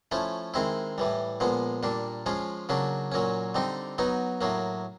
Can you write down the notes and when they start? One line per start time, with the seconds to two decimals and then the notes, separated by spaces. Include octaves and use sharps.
0.11 F3 A3 C#4 E4
0.54 D#3 G#3 C4 E4
0.98 A2 E3 G3
1.40 A#2 F3 G#3 B3
1.83 A#2 G3 A#3 D4
2.26 F3 G#3 C#4 F4
2.69 C#3 F#3 A#3 D4
3.12 A#2 F#3 A#3 C#4
3.55 D3 G3 C4 D#4
3.98 F#3 B3 D#4
4.41 A2 F#3 A#3